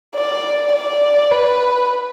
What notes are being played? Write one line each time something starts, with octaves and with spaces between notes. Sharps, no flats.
D5
D5
B4